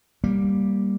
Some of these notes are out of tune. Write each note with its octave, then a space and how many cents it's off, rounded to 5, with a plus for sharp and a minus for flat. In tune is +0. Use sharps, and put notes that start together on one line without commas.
G3 +0 A#3 +5